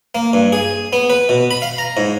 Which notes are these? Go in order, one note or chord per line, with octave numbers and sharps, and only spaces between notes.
A#3
G2
G#4
B3
B4
B2
B5
F5
A#5
G#2